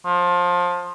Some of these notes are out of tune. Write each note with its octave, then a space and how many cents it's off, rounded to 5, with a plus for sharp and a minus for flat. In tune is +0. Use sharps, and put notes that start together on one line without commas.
F3 +20